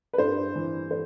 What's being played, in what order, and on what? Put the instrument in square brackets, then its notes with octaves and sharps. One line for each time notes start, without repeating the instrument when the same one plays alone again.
[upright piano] B4
G2 C5
E3
C5